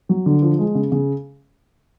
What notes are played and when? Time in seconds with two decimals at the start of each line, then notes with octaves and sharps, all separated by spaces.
0.09 F#3
0.26 D3
0.42 F3
0.59 G#3
0.75 C#3
0.92 C#3